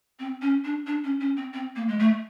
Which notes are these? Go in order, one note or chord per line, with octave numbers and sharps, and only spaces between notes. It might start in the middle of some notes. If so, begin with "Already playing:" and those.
C4
C#4
D4
D4
C#4
C#4
C4
C4
A#3
G#3
A3